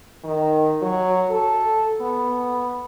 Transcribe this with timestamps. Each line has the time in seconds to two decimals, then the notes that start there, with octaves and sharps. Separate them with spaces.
0.24 D#3
0.82 F#3
1.31 A4
2.01 B3